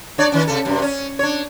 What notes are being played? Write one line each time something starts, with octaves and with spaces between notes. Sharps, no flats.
D4 C#5 D5
D#3 C#4
C3 A4
F#2 C3
C#4
D4 C#5